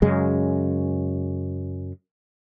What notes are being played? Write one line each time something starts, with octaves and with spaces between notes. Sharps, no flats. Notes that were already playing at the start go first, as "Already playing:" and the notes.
F#2 C#3 G#3